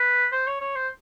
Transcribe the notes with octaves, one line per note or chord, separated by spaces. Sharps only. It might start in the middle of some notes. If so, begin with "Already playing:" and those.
Already playing: B4
C5
C#5
C#5
C5